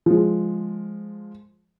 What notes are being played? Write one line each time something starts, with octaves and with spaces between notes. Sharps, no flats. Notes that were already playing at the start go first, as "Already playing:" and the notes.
F3 G#3